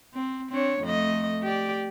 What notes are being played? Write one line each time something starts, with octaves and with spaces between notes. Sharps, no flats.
C4
C4 D4 C#5
F2 A3 D#5
G4 D5